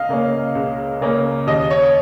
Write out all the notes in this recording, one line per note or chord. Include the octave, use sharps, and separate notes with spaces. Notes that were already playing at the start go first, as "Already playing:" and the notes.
Already playing: C#2 D#5 F5
C#3 A#3 C#4
C#2
C#3 A#3 C#4
D#2 D#5
C#5